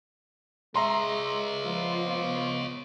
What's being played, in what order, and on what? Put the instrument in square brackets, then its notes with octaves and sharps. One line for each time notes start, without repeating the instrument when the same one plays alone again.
[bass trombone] G#3 [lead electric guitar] C#5 D#5 [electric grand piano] E5 A#5 C6
[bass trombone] F3 [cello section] B3 F4